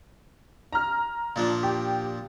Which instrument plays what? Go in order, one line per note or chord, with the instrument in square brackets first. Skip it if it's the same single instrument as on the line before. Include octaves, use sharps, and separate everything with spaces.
[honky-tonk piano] A#5 F6
[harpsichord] A#2 F3 D4
[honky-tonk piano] G4